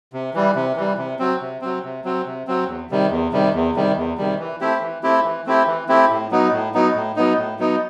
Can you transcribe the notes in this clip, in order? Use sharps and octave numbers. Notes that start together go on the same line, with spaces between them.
C3
E3 G3
C3
E3 G3
C3
F#3 C4
C3
F#3 C4
C3
F#3 C4
C3
F#3 C4
E2
C3 D#3 G3
E2
C3 D#3 G3
E2
C3 D#3 G3
E2
C3 D#3 G3
E3
A3 C4 E4 G4
E3
A3 C4 E4 G4
E3
A3 C4 E4 G4
E3
A3 C4 E4 G4
A2
F#3 B3 D#4
A2
F#3 B3 D#4
A2
F#3 B3 D#4
A2
F#3 B3 D#4